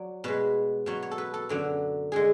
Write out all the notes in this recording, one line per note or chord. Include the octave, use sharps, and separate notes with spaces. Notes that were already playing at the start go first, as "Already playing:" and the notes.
Already playing: F#3 D5
B2 G#3 B4
B2 F#3 C#5
C#5
A4
B4
A4
F#2 D3 F#3
D3 G#3 G#4